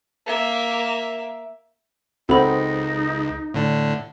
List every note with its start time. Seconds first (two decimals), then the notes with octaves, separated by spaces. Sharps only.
0.26 A#3 E5
2.29 C#2 C4 D#4 F#4 A4 B5
3.54 A2 D3 D4